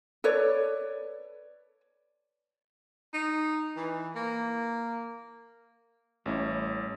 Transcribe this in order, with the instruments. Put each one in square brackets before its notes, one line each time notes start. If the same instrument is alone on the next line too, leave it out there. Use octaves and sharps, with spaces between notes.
[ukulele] A4 B4 C#5 D5
[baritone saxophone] D#4
E3
A#3
[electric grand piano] A1 C#4 E4 [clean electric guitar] G3 A3